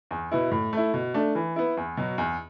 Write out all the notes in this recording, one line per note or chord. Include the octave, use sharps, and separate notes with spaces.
E2
B2 B3 E4
A2
A3 E4
B2
A3 D4
E3
B3 E4
E2
B2 F#3
E2